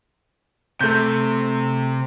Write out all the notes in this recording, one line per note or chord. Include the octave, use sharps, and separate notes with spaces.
C3 A3 G6